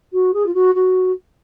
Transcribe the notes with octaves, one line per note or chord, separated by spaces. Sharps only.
F#4
G#4
F4
F#4
F#4